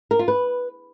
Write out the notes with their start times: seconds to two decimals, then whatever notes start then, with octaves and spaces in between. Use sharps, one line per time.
0.11 A#4
0.19 F4
0.28 B4